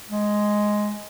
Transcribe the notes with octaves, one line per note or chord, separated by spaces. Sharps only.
G#3